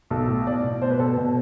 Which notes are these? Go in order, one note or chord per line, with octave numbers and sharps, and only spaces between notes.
B1 A4
A2
B2 D5
B2
B2 C5
B4
B2 A4
B2